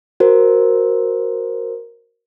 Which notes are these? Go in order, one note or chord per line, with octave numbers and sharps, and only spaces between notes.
F#4 A#4 C5